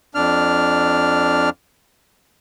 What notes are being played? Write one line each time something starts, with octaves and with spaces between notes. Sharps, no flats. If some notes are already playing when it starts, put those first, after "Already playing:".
F2 D4 F6